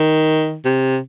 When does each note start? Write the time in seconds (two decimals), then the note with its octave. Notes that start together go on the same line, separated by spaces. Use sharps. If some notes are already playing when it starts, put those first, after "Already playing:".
Already playing: D#3
0.65 C3